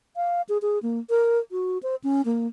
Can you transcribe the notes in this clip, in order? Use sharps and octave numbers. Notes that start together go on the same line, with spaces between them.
F5
G#4
G#4
A#3
A#4
F#4
C5
C#4
A#3